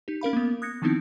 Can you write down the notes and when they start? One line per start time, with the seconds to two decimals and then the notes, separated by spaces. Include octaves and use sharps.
0.08 D#4 G4
0.21 C#4 A#4 F5 B5
0.33 A#3 B3
0.62 D#6 F#6 G#6 A#6 C#7
0.82 D#3 F3 B3 C4 D#4 E4